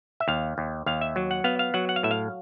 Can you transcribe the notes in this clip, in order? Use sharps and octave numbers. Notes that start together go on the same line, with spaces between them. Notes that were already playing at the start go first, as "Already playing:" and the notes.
E5
D#2 F5
D#2
D#2 F5
E5
F#3
F#5
B3 F5
F5
F#3 F#5
F#5
F5
A2 E5
F5